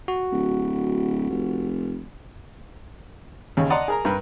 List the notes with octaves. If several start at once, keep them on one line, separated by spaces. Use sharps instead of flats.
F#4
D1
F1
D#2 C#3 C#4
D5 D#5 F#5 A5 A#5 C6
G#4 A#4 A#5
G2 A#4 B4